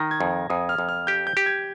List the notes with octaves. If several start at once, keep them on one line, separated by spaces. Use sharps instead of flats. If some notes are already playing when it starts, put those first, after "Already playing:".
Already playing: D#3 A#6
G#6
F2
F2 D#6
F6
F2
F6
G4 G6
G6
G4
G#6